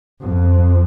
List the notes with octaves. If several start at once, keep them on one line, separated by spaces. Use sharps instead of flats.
F2